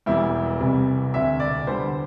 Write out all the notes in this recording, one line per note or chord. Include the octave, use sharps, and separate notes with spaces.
E1 E2 E3 G3 E4
C2 C3 E3 G3
E1 D2 C3 E5
D5
E2 D3 G3 C5